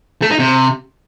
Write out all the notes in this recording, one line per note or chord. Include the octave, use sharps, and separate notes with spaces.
A3
D#4
C3